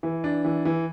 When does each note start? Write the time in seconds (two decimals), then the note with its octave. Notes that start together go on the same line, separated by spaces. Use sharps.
0.03 E3
0.24 D4
0.45 E3
0.65 E3